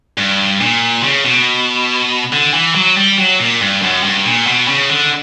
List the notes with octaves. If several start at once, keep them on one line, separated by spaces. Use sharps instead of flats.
G2
A#2
C#3
B2
D3
E3
F#3
G3
F#3
A#2
G2
F#2
G2
A#2
B2
C#3
D3